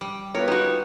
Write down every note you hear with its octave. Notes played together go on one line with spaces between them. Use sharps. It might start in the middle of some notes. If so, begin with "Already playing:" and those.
G3
B3 F4 A#4 B4 C#5
D#4 F#4 G4